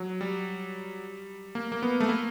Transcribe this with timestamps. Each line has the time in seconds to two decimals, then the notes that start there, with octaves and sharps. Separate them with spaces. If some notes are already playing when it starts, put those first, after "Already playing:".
Already playing: F#3
0.21 G3
1.55 A#3
1.72 A#3
1.82 B3
2.00 A3
2.09 A#3